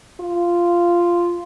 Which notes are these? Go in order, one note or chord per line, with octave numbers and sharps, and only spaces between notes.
F4